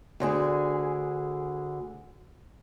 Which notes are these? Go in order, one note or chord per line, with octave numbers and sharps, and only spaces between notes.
D2 D3 G#4